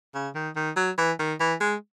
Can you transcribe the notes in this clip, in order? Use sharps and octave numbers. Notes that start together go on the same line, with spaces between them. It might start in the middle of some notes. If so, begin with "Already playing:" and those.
C#3
D#3
D#3
F#3
E3
D#3
E3
G#3